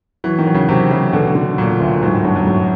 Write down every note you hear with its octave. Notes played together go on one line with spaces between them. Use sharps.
E3 F#3
D#3
F#3
C#3
C3 F#3
C#3 F#3
B2 D3
D3
A#2 F#3
D2
G#2 F#3
A2
G2 F#3
F#2
G2 F#3